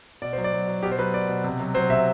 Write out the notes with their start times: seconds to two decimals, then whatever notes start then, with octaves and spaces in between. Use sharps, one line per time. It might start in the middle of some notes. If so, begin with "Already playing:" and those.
0.22 B2 D5
0.33 F#3 C5
0.44 D5
0.53 F#3
0.68 F#3
0.83 B2 G4
0.92 C5
0.99 F#3 B4
1.13 B2 D5
1.29 B2
1.44 C3
1.60 F#3
1.74 F#3 C5
1.90 C3 E5